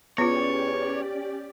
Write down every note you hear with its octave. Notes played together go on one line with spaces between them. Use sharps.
E2 B3 C#4 F4 G4 C#5 D5